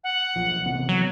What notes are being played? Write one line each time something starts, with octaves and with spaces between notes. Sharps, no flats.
F#5
B1 F3
C3 E3 B3
F#3